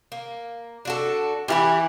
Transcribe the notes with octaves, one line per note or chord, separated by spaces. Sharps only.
A#3
D4 F#4 A4
E3 E4 F#4 G4